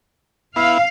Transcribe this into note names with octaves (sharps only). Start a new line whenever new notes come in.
B3 E4 F5